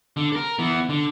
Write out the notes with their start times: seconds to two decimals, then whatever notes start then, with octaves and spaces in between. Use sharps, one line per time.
0.17 D3
0.32 A4 A#4
0.59 E3 B3
0.89 D3